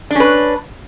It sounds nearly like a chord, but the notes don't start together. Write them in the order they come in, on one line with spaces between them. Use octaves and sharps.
D4 C#4 B4